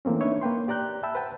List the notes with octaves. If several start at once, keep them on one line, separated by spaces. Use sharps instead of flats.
E3 A3 A#3 C4 C#4
D4 D#4 B4 C#5 E5
A#3 B4 G5 C6
G4 D5 A#5 F#6 G6
E5 G5 A5 B5 E6
B4 C5 F#5 G5 A5